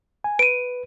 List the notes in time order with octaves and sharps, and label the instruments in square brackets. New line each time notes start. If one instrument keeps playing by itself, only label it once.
[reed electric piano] G#5
[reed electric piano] B4 [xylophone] D7 D#7